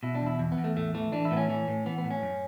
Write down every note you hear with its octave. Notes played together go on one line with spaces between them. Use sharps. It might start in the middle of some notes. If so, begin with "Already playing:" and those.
B2 E4
D4
E2
E4
E2
B3
E2
A3
A2 A3
E3 A3
E3 D4
E4
A2 B3
C#4
E3 C#4
A2
E3 B3
B3
A2
C#4
F#2